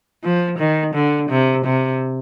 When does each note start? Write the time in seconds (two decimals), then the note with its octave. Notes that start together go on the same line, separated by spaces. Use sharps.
0.24 F3
0.58 D#3
0.94 D3
1.29 C3
1.65 C3